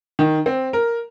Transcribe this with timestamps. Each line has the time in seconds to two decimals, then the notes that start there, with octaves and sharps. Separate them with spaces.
0.19 D#3
0.46 C4
0.73 A#4